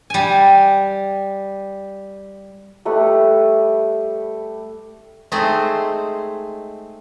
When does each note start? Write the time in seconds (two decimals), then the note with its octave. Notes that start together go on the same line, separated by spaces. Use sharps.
0.10 G3 G#5
2.85 G3 A3 B4
5.31 G#3 A3 C4 D#4 G#4 C5